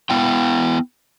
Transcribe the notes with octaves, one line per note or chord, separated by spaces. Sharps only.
B3 E4 G5